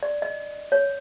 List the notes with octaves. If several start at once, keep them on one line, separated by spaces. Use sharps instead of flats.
D5
D#5
C#5